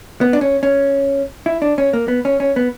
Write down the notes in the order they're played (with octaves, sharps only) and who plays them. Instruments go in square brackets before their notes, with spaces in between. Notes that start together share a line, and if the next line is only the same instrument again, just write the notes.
[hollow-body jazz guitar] B3
D4
C#4
C#4
E4
D4
C#4
A#3
B3
C#4
C#4
B3